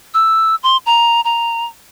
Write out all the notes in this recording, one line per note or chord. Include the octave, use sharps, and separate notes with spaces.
E6
C6
A#5
A#5